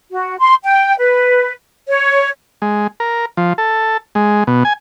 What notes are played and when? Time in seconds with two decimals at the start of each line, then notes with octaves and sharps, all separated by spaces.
0.12 F#4
0.39 C6
0.64 G5
0.98 B4
1.87 C#5
2.62 G#3
3.00 A#4
3.37 F3
3.58 A4
4.15 G#3
4.47 B2
4.65 G#5